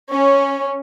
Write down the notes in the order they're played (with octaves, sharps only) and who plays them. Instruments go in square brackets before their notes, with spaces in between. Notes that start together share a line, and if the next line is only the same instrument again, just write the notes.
[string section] C#4